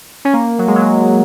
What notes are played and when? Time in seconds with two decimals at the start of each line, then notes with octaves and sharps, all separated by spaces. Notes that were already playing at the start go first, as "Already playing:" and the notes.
0.25 C#4
0.33 A#3
0.59 F#3
0.68 G#3
0.76 F#3
0.85 G#3